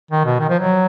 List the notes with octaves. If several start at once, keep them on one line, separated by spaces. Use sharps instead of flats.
D#3
B2
D#3
F3
F#3